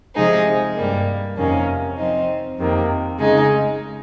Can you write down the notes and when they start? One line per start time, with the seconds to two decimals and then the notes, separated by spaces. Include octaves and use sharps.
0.15 C3 F3 G#3 D#4 G#4
0.75 G2 G3 A#3
1.36 F2 C3 D#3 A#3 C#4
1.97 F3 C4 D#4
2.58 F2 C3 D#3 A#3
3.18 C#3 G#3 D#4 G#4